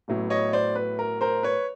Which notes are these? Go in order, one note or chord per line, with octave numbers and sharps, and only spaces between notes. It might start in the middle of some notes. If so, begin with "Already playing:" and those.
A1 A2 F#3 B3 E4
C#5 D#5
C5 D5
B4
A#4
A#4 C5
B4 C#5